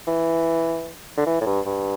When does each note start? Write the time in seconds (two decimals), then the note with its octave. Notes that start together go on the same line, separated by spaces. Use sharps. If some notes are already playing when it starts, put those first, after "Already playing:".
0.07 E3
1.17 D3
1.26 E3
1.41 A2
1.46 G2
1.66 G2